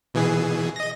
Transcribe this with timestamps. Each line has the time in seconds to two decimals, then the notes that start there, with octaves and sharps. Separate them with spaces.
0.14 B2 E3 G#4
0.76 D#5 A#6